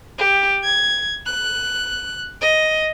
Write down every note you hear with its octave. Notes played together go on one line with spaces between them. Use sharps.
G4
G#6
F#6
D#5